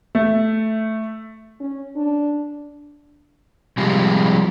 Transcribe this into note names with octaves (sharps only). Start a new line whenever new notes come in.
A3
C#4
D4
C3 F3 G3 G#3